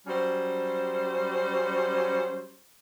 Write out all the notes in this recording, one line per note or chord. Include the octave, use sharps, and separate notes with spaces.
F#3 G3 C#4 C5